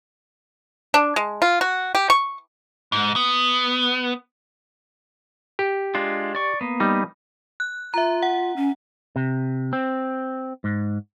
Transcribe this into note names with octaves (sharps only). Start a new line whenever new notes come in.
D4
G#3
F4
F#4
G4
C#6
G#2
B3
G4
G#3 D4 F4
D5 C#6
A#3 B3
G3 D#4
F#6
F4 E5 A#5
F#5
C#4
C3
C4
G#2